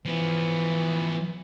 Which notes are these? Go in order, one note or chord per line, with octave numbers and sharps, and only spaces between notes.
E3 F3 B3